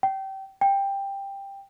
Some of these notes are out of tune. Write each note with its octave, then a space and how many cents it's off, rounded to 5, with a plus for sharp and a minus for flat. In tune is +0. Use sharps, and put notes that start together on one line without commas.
G5 -25
G5 +10